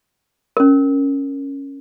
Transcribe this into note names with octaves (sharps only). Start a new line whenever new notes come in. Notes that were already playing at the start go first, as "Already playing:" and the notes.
C#4 A#4